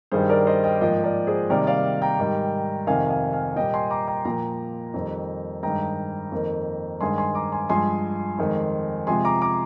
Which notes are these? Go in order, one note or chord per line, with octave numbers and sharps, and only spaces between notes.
G2 D#3 G3 G#4 C5
A#4 D5
C5 D#5
D#5 G5
G#2 F3 A#3 D#5 G5
A#4 D5
G#4 C5
C3 D#3 G3 A#3 A#4 D5
D5 F5
G5 A#5
G#2 D#3 G3
F2 C3 D#3 F5 G#5
F5 G#5
F5 G#5
A#2 G3 A#3 D#5 G5
G#5 C6
A#5 D6
G5 A#5
A#2 F3 A#3 G5 A#5
F2 D#3 G3 A#3
G2 D#3 G#3 G5 A#5
F2 D#3 A#3
G2 D#3 G#3 G#5 C6
G#5 C6
A#5 D6
G#5 C6
G2 F3 G#3 G#5 C6
F2 D#3 G#3
C3 F3 G#3 G#5 C6
A#5 D6
A#5 D6